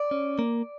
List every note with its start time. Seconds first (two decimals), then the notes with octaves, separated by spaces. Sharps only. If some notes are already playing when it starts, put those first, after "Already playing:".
Already playing: D5
0.11 C#4
0.39 A#3